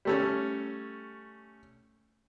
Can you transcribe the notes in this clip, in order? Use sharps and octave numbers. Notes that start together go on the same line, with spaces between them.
G3 A3 C#4